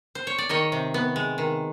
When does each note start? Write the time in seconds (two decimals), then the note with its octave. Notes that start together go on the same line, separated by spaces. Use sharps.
0.15 C5
0.27 C#5
0.38 D5
0.49 D#3 C#5 D#5
0.72 C3
0.94 B3
1.16 G#3
1.38 D#3